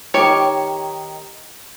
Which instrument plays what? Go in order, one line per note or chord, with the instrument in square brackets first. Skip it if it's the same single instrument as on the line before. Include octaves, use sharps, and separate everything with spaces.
[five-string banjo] D#3 G4 C#5